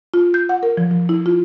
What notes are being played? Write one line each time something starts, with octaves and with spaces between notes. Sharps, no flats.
F4
G6
F#5
A#4
F3
F3
E4
F4